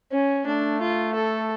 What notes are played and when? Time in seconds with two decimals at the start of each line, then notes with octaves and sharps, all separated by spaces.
0.12 C#4
0.46 A3 D4
0.81 F4
1.15 A4